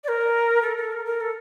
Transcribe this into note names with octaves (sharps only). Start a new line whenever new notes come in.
D5
A#4
A4
A4
A#4
A#4
A4